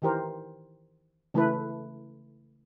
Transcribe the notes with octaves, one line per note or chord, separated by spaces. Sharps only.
D#3 E3 G4 A#4 C5
C#3 E3 A3 E4 A4 B4